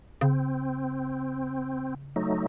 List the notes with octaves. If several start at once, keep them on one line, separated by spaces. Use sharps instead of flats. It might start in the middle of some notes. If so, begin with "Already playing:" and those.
C#3 C4
F#3 A3 D#4